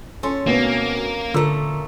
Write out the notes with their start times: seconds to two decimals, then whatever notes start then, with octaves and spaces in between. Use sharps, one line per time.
0.23 C#4 A4 C6
0.47 D2 B2 A#3 B3
1.34 A#2 D3 A3 A#4 E6